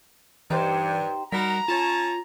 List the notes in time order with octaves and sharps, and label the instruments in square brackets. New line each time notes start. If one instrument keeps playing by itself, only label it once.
[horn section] G2 [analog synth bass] E3 [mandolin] D#4 G4 C5
[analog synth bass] G3 [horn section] D#4 F#4 A#4 [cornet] A#5 [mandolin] B5
[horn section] C#4 C#5 A5 [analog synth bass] F4